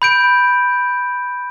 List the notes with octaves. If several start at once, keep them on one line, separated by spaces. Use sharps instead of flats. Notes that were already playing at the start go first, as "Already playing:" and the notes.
B5 G6 D7